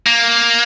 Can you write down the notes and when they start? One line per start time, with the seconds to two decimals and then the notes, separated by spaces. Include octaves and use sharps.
0.07 A#3